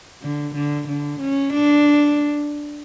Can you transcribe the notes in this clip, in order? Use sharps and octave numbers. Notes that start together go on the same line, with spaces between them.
D3
D3
D3
C#4
D4